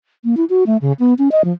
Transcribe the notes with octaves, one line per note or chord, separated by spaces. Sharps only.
A#3
E4
F#4
A3
C#3
B3
C#4
D#5
F3